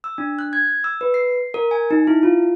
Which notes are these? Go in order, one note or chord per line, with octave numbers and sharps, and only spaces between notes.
E6
D4
F#6
G#6
E6
B4
C7
A#4
G#5
D#4
E4
F4